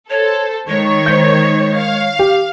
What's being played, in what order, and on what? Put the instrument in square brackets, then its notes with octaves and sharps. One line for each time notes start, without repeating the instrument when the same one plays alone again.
[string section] A4 C5 [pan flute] C#5
[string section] D#3 [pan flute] G#3 [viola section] C#5
[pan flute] G#3 [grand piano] C5 G6
[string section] F5
[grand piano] G4